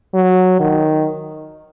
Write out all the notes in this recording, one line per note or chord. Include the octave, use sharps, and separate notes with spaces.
F#3
D#3